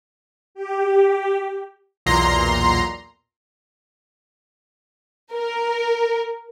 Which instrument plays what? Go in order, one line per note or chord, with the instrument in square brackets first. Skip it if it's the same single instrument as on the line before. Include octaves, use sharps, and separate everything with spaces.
[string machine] G4
[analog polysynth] B1 E2 A#2 A#5 C6
[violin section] A#4